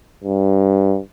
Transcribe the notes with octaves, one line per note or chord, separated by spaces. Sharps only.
G2